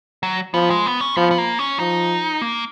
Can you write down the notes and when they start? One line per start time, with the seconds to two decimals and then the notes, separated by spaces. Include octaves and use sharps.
0.23 F#3
0.54 F3 B3
0.70 G#3
0.86 B3
1.01 C#4
1.17 F3 B3
1.31 B3
1.38 A#3
1.59 C#4
1.79 F3 D#4
2.41 A#3